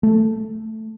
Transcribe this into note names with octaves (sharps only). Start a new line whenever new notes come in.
A3